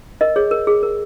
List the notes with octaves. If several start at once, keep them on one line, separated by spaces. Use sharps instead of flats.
A#4 D#5
G#4 C#5
A#4
G#4
A#4